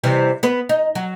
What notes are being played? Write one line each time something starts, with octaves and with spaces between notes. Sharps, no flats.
C3 E3 G3
B3 B4
D#4
F#3